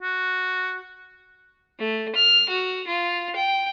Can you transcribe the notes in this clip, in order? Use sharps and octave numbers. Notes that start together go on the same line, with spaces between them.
F#4
A3
F6
F#4
F4
G5